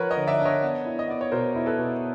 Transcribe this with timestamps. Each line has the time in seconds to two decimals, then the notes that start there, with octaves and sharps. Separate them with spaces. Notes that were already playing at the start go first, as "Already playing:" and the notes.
Already playing: F3 A#4 B4 C#5 F#5
0.11 C#5 D#5
0.17 D3
0.27 D5 E5
0.39 D4
0.45 C#5 D#5
0.63 B3
0.85 E4
0.99 D#5
1.08 B3 D5
1.21 C#5
1.32 B2 A#4 C5
1.55 E4
1.66 A4 B4
1.79 B2